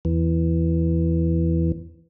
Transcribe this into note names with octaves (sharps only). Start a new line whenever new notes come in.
E2 E3